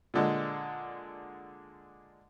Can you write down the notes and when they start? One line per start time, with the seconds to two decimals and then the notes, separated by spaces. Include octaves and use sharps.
0.14 A#2 D3 G#3